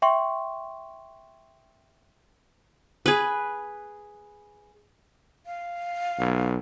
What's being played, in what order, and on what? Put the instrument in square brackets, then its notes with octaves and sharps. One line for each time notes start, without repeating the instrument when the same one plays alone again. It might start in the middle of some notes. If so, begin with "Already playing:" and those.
[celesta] E5 G5 C6 C#6
[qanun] G#4 B4
[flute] F5
[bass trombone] B1